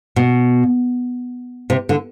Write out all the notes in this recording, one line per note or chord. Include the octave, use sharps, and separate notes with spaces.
B2
C3
D3